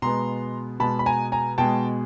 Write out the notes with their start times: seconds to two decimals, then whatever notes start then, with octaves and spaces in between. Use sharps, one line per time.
0.02 B2 G#3 B3 A#5 C6
0.80 B2 G#3 B3 A5 B5
0.99 B5
1.06 G#5 A#5
1.32 G#5 A#5
1.58 B2 G#3 B3 G5 A5